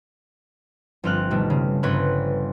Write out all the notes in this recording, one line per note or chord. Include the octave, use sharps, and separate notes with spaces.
G1 F3 C4 F6 F#6
B2 D#3 G3 A3
C#3
G1 C4 B4 C#5 F#6